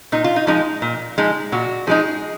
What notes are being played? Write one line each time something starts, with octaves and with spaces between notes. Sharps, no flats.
A#2 D#4
F4
D#4
F3 G#3 D#4
A#2
F3 G#3 D#4
A#2 F#4
F3 G#3 D#4 G#4